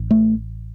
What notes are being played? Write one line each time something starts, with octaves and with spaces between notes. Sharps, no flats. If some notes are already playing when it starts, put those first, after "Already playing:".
Already playing: A1
A3